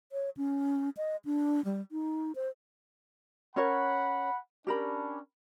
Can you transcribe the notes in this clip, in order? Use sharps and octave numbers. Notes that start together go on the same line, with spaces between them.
C#5
C#4
D#5
D4
G3
D#4
C5
C#4 A#4 C#5 F#5 B5
C#4 D4 G4 A#4 B5